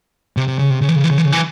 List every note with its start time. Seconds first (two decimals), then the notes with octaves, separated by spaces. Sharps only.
0.37 C3
0.48 C3
0.59 C#3
0.70 C3
0.81 C#3
0.89 E3
0.96 C#3
1.04 E3
1.11 C#3
1.18 E3
1.25 C#3
1.32 E3